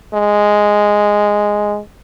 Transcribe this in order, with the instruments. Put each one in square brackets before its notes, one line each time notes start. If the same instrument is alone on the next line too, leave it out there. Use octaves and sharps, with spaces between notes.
[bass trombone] G#3